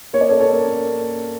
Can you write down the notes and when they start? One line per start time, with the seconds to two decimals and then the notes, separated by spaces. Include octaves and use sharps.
0.13 A#3 C#5
0.21 D5
0.29 A4 C#5
0.40 A4 C#5
0.53 A#3